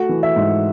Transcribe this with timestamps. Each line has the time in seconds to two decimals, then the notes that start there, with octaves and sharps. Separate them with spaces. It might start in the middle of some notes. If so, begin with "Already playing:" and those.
Already playing: A3 F#4 F#5
0.09 E3
0.23 E5
0.36 G#2